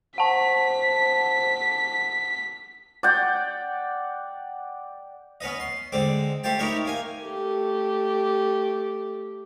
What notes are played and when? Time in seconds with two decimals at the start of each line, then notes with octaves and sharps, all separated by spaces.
0.18 C5 F#5 A5 B6
3.03 D5 F#5 G5
5.41 B3 C#4 B4 D#5
5.60 C6
5.92 D3 G#3 C4 D6
6.44 A3 G4 C5 G5 A5
6.59 D#4 E4 G4 A#4 C#5
6.85 A#3 G#5
7.24 A3 G4